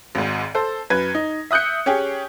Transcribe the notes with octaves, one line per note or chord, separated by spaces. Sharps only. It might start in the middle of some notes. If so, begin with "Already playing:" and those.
G#1 G#2
A4 C5
F#2 B4 G#6
D#4
E5 D#6 F#6 G6 C#7
C#4 G4 G#4